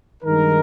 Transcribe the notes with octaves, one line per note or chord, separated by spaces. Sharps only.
G2 D#3 G#3 D#4 A#4